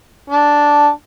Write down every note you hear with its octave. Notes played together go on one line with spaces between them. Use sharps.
D4